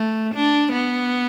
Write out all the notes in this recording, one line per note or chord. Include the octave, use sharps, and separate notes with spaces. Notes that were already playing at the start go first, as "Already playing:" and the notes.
Already playing: A3
D4
B3